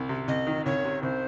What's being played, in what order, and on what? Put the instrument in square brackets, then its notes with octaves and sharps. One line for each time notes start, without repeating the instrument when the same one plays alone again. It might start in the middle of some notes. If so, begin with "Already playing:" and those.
Already playing: [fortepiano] C2
C3
[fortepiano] C2 [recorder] D#5
[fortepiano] D#3
[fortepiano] C2 [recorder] C#5
[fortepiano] C3
[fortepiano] C2 [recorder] C5